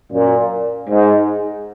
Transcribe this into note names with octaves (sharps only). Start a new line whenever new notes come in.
F#2 A#2
G#2